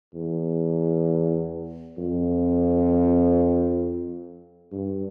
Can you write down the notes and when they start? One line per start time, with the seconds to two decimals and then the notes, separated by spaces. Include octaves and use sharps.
0.15 E2
1.98 F2
4.72 G2